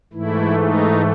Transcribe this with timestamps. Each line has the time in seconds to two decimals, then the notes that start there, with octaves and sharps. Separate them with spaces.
0.13 G#2 E3 A3 E4
0.60 D#4